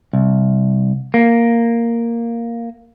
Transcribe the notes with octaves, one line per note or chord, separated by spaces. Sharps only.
C2
A#3